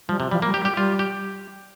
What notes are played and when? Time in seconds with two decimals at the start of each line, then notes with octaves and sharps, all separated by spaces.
0.09 F3 G3
0.20 C3
0.31 F3 G3
0.42 A#3
0.46 G3
0.54 G4
0.62 G3
0.65 G4
0.76 G3 F4
0.99 G4